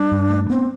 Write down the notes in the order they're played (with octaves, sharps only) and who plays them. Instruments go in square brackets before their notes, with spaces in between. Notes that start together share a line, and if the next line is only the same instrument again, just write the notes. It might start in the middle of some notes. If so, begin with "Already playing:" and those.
Already playing: [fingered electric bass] G3 [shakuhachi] D4
[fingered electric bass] G2
A3
[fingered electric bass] B3 [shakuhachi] C4